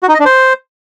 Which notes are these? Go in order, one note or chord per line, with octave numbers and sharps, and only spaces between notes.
F#4
D#4
D#5
D4
C5